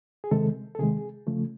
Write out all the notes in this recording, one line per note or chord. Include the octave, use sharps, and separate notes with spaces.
G#4
C3 D#3 G#3 A4
A4
C3 D#3 G#3 G#4
C#3 F3 A3